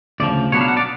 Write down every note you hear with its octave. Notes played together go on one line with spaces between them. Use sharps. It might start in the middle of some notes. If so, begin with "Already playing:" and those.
D2 C#3 F3 D5
B2 F#3 B3 D4 C#5
F5
F#5
D5